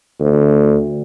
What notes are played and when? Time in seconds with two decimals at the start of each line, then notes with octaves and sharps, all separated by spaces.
0.20 D2